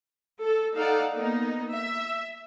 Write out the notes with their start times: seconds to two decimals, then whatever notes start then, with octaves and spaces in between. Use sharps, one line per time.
0.41 A4
0.76 D#4 A4 D5 F5 F#5
1.14 A#3 B3 D#4
1.73 E5